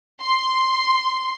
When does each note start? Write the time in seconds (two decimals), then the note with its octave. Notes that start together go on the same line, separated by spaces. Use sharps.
0.22 C6